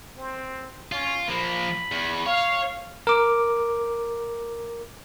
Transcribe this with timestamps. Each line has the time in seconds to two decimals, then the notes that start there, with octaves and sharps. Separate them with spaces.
0.18 C4
0.92 C#4 F4
1.28 F3 A#3 B5
1.92 E2
2.26 C#5 F5
3.07 A#4 D6